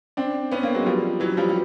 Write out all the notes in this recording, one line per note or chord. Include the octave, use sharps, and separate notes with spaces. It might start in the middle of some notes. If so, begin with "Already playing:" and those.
C4 D4
B3 C#4
A#3 C4
F#3 G#3
F3 G3
E3 F#3
F3 G3
G3